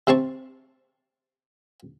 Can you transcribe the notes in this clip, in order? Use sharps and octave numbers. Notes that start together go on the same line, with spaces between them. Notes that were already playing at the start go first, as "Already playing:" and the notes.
C3 C4 C5 A5 C#6